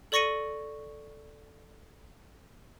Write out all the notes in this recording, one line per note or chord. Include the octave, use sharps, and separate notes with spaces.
A4 D5 C#6 A#6 C#7 D#7